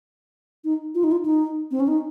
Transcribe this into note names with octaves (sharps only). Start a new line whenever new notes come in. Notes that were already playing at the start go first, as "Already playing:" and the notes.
D#4
F4
D#4
F4
D#4
C4
C#4
D#4